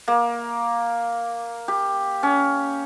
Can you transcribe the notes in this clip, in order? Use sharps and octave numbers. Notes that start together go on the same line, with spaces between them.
A#3
G4
C#4